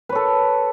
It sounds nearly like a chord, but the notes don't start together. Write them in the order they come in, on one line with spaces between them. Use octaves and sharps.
B4 C#5 A4